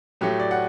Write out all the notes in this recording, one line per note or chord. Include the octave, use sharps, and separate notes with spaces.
A2 F#3 A3 G4
D5
F#5